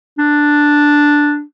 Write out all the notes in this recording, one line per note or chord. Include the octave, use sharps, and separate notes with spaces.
D4